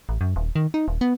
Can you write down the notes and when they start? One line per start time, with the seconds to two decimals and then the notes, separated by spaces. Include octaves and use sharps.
0.09 A1
0.21 F#2
0.36 D#1
0.56 D#3
0.74 D#4
0.88 D#1
1.01 B3